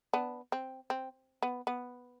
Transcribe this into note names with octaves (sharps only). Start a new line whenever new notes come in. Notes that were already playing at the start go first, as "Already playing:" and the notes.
B3 D4
C4
C4
B3
B3